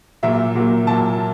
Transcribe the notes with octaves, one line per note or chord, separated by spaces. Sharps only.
A#2 F#3 A#3 E5
A#2 F#3 A#3
A#2 F#3 A#3 A5